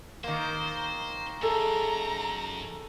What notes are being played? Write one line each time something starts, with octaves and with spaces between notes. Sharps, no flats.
D#3 A#3 C5
F#2 G#4 A4 A#5